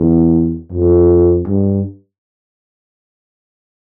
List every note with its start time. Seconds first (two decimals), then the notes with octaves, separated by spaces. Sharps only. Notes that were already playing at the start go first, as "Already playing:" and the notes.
Already playing: E2
0.73 F2
1.47 G2